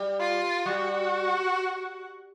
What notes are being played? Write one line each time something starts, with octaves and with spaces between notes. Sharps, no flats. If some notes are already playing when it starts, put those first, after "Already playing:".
Already playing: G3
F4
G3 F#4